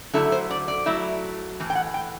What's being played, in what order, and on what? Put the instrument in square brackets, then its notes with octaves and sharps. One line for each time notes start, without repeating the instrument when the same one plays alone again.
[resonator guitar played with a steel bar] D3 F#3 A3 E4 A4
C5
D5
D5
F#3 A3 E4
A2 E3
G5
F#5
G5